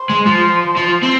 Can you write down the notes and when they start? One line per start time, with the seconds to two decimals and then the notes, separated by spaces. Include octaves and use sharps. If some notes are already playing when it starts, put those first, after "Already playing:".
Already playing: C5
0.09 G#3
0.26 F3
0.77 F3
1.03 C4